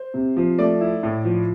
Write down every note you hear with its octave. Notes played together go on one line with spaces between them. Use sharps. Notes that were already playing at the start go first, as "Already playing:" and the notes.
Already playing: C5
C3
F3
A3 D5
E4
A2
F3